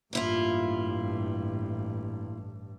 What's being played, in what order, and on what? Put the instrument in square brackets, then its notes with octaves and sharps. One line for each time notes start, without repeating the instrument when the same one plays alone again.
[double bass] A1 G2 [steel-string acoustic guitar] A#3 E4 F4